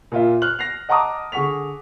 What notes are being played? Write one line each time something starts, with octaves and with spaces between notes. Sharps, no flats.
A#2 F4 E5
F6 F#6 F#7
A#6 C7 F7
D#5 F#5 A5 A#5 D6 D#6
D3 G#4 F#5 C#6 B6 F7